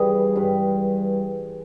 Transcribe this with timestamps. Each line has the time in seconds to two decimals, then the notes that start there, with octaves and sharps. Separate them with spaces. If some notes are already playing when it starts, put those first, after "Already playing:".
Already playing: G2 E3 G3 G#4
0.36 G2 G3